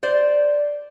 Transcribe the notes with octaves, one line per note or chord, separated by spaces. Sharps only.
C5 D5